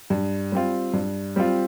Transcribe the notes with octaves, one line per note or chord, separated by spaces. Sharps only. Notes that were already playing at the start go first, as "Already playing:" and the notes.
G2
G3 C4 F4
G2
G3 C4 F4